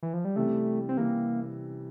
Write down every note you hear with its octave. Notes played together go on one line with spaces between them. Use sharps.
E3
F3
G3
C3 E3 G3 A3
C4
C3 E3 G3 A#3